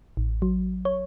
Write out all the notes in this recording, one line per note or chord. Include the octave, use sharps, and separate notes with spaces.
A1
F#3
C#5